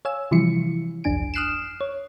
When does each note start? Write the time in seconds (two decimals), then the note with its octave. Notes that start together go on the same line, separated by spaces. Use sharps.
0.05 C#5 F5 G#5 E6
0.31 C3 E3 F3 G3 E4 C#7
1.04 G1 C2 F2 D4 G#5 D7
1.34 D#6 F6 F#6 C7 D7 E7
1.81 C#5